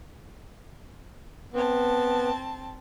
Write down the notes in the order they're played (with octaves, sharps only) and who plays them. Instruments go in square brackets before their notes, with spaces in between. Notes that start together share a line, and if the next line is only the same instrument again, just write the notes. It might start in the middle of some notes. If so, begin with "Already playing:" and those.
[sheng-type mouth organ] B3 [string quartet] C4 A5